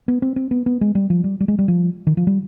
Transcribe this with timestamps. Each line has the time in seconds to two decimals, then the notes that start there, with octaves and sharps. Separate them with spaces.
0.08 B3
0.22 C4
0.36 C4
0.51 B3
0.66 B3
0.81 G#3
0.95 G3
1.10 F3
1.24 G3
1.40 G3
1.48 G#3
1.59 G3
1.68 F3
2.07 D#3
2.17 F3
2.27 G3